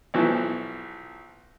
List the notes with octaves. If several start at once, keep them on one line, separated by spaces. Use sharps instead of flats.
B1 B2 E3 F3